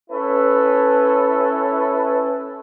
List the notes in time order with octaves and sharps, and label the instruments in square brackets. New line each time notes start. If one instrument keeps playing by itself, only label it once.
[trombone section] C#4 E4 A4 B4